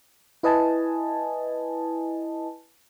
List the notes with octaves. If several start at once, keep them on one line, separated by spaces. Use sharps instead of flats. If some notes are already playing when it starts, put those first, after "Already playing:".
E4 B4 D#5 G#5 A5